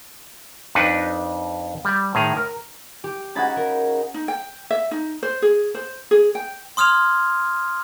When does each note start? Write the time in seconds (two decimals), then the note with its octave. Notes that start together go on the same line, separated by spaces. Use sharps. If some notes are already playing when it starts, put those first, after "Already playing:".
0.75 F2 D4 D#4 B4
1.85 G3
2.15 A2 D#3 G#4 A#5
2.37 A#4
3.04 G4
3.35 C#3 D#4 F#4 B5 G#6 A6
3.56 A#4
4.14 D#4
4.28 G5
4.71 E5
4.91 D#4
5.23 C5
5.42 G#4
5.75 C5
6.11 G#4
6.35 G5
6.77 C6 D#6 F6 G#6 F7